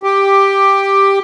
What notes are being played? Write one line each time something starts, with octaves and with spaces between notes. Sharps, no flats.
G4